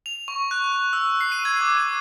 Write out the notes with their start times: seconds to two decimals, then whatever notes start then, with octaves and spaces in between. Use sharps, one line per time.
0.06 F7
0.28 C#6
0.51 F#6
0.93 E6
1.21 C7
1.32 D#7
1.45 G#6
1.61 D6
1.77 D#7